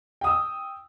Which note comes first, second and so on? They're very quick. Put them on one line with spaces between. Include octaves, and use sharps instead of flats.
G5 D#6 E6